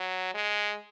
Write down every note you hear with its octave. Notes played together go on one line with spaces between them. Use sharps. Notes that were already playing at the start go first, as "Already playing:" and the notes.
Already playing: F#3
G#3